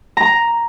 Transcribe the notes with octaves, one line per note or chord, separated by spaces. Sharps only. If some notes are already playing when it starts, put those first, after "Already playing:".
A#5